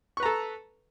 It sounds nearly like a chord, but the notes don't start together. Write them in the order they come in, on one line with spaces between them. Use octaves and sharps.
C#6 B4 A#5 A4